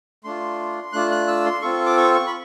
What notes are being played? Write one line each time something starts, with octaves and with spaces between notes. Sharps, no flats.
A3 D4 F4 C6
A3 D4 F4 F#6
F#6
E6
C6
C4 F4 A4 C#6
D6
C#6
C#6
B5